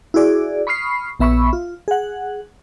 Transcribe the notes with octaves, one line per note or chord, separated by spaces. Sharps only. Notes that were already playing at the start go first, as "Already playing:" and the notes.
E4 F#4 G#4 D5
B5 C#6 D#6 F6 C7
A#1 B3 E5 B5 C#6 E6
F4
G#4 F#5